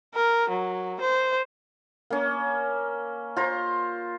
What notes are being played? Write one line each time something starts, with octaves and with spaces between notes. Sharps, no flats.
A#4
F#3
C5
A#3 C#4
F4 C5 A#5